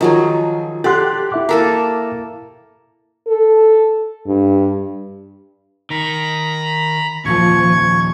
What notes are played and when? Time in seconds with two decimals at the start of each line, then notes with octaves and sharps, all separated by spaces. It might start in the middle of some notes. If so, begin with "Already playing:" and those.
0.01 D#3 F3 F#3 G#4
0.84 G4 A4 D5 F#5 C6 F#6
1.32 E4 E5 D6
1.49 A#3 A4 A#4
3.28 A4
4.27 G2
5.90 D#3 A#5 B5
7.25 D#2 A#2 F3 C#6 G#6